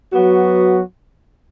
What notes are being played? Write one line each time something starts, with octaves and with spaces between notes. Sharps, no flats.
F#3 B3 F#4